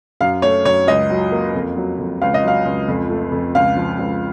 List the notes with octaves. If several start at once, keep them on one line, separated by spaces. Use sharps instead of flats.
F#2 F5
A3 C#5
F#2 C#5
C#2 D#5
F#3
A#3
F2
F#3
F2
C#2 F5
D#5
F#3 F5
C#2
F2
A3
F2
C#2 F5
F3
C#2